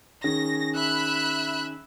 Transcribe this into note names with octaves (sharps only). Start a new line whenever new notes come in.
D#3 C#4 G#4 A#6
E5 B5 F#6